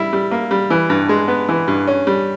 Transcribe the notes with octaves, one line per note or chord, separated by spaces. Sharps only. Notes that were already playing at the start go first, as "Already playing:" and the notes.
Already playing: G3 E4
G3
A#3
G3
E3
G2
G#3
B3
E3
G2
C#4
G3